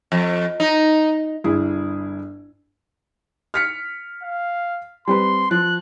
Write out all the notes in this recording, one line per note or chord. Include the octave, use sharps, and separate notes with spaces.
F2
D#4
G1 E4 G#4
F6 B6 C#7
F5
G3 C4 B4 C6
F3 F#6